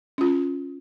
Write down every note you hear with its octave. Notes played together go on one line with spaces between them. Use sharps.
C#4 F4